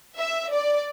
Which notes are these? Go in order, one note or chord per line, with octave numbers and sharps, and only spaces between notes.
E5
D5